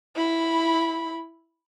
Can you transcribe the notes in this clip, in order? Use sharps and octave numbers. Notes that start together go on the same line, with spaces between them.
E4 B5